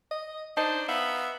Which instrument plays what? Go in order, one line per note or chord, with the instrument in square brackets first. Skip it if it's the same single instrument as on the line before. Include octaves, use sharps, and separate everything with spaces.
[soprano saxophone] D#5
[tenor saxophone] D4 [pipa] D#4 [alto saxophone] C5 [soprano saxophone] A5
[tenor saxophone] B3 [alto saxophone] E5 [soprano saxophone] F5